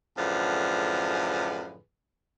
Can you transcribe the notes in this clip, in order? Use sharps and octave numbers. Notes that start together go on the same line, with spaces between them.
F#2 A2 D3 F3 G#4 B4